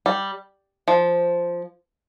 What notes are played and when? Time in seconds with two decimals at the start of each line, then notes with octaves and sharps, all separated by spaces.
0.06 G3
0.88 F3